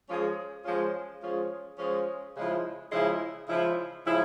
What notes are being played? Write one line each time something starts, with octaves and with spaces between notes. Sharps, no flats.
F3 G#3 C#4 F4 G#4
F3 G#3 C#4 F4 G#4
F3 G#3 C#4 F4 G#4
F3 G#3 C#4 F4 G#4
C#3 F3 G#3 E4
C#3 F3 G#3 E4
C#3 F3 G#3 E4
C#3 F3 G#3 E4